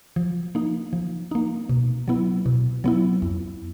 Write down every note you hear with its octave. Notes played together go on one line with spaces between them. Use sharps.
F3
A#3 D#4
F3
A#3 D#4
B2
F#3 B3 E4
B2
F#3 B3 E4
F2